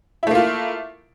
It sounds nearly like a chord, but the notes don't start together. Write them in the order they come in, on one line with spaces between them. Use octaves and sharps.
E4 A3 A#3 F4